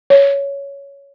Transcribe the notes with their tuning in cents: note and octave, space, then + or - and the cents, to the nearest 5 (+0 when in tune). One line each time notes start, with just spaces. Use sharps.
C#5 +10